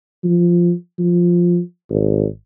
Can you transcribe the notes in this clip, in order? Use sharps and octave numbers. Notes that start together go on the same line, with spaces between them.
F3
F3
G#1